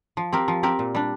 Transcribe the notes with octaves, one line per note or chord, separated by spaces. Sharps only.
F3
C4 G4 A#4
F3
C4 G4 A#4
A#2
G3 D4